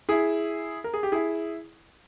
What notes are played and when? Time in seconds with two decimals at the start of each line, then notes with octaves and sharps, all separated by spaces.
0.09 E4 G#4
0.84 A#4
0.94 G#4
1.03 G4
1.12 E4 G#4